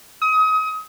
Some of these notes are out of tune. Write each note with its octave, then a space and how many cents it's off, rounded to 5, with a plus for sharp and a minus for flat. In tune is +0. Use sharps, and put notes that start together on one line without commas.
D#6 +30